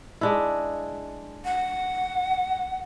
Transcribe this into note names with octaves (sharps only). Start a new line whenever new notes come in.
G#3 D4 E4
F#5